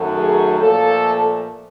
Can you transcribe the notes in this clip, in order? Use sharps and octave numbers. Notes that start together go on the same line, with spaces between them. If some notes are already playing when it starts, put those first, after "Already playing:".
Already playing: F#2 D#3 F#3 A3
G#4
A#2 F3 A3 A4